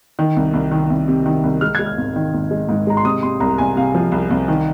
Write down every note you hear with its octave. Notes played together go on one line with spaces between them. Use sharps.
D#3
C2
C2
D#3
C2
C3
D#3
C2
G#3 F6
G#3 G#6
F6
G#1
D#3
G#1
G#3
G#2
G#3 A#5
C6
C3 D#6
C3 C6
C2 A#5
C2 G#5
C3 F5
F3
C2
C2
D#3